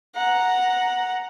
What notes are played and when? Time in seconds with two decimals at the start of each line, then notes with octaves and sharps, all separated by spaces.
0.15 F#5 A#5